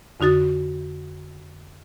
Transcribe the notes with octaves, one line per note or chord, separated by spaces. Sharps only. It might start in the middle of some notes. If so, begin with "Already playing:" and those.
F2 D3 D#4 F#4 A6